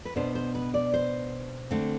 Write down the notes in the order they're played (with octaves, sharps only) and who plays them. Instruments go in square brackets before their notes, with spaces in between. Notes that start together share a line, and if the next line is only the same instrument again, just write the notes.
[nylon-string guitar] B4
B2 B3 D4 C5
C5
B4
D5
C5
D3 A3 C4